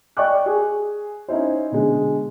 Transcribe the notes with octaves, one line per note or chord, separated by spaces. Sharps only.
D5 D#5 G5 C#6 D6 F#6
G#4
C#4 D#4 E4 C5
B2 D3 G#3